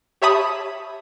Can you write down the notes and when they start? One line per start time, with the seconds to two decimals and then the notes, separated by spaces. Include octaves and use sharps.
0.22 G4 C#5 E5 A5 B5 D#6